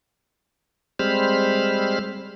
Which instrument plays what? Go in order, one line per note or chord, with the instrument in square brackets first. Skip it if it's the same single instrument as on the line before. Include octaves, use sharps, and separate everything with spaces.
[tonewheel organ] G3 G#3 C4 C5 B5 F6